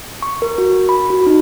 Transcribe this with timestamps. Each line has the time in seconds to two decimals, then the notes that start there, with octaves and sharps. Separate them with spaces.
0.22 C#6
0.42 A#4
0.58 F#4
0.89 B5
1.10 F#4
1.27 D#4